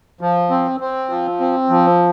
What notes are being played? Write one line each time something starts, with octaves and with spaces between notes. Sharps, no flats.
F3
C4
C4
F3
C4
F3